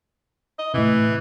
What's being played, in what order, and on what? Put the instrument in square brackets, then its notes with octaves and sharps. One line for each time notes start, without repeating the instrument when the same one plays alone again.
[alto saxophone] D#5
[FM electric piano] A2 C3 [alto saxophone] E3